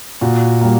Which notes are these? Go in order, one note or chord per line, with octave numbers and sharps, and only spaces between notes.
A#2 F#4
G3 A#3